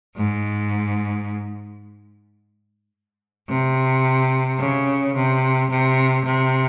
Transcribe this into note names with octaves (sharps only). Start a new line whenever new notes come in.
G#2
C3
C#3
C3
C3
C3